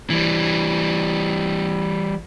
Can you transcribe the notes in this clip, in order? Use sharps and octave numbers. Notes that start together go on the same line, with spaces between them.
E3 G3